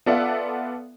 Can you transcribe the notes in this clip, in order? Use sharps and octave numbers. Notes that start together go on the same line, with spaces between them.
B3 F4 A4 D5 E5 F#5